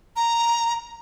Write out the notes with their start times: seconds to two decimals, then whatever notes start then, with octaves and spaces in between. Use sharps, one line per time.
0.16 A#5